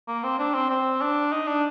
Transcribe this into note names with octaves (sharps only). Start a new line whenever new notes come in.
A#3
C4
D4
C4
C4
D4
D#4
D4